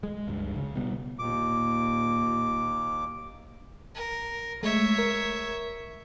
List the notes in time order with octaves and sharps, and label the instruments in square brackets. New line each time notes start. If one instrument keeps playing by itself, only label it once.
[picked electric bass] G#3
C#2 G2
C#3
B2 G3 B3
[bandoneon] D#2 D6 [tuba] A#2
[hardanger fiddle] A#4
[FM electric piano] G#3 A3 [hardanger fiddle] C#5 E5
[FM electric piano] A#4